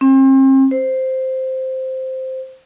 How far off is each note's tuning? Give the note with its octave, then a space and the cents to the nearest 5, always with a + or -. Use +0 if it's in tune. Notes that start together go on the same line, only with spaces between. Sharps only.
C4 +40
C5 +0